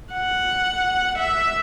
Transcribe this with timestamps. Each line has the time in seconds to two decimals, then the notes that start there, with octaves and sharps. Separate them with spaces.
0.13 F#5
1.19 E5